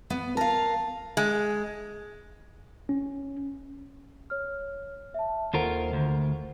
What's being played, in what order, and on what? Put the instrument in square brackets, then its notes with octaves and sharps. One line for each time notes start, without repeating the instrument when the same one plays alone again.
[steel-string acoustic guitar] B3
[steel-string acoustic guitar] A#4 F5 [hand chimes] A5
[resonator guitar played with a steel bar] G#3
[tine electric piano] C#4
[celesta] C#5 F6
E5 A5
[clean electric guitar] D#2 F4 A#4 [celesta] A4 C5 F#5
[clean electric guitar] D2